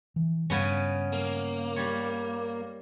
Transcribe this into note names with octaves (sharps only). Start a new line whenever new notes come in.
E3
G2 C#3 B3 C#4
A#3
G3 C#5